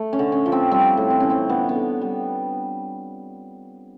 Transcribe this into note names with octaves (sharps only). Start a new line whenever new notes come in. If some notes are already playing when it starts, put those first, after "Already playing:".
Already playing: A3
C#4
D3
C#4
F3
C4
G3 C4
A2
C4
E3 C#4
C4
D3 B3
B3
D3
G3